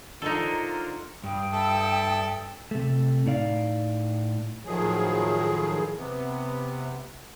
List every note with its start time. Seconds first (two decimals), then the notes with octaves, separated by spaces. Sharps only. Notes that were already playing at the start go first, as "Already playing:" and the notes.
0.22 D3 D#4 F4 A4 A#4 C5
1.24 G2 G5 D#6
1.53 A4 E5
2.71 C3 A3
3.26 A2 D#4 D5 F5
4.66 A2 D#3 F3 F#3 G#4
5.97 C3 B3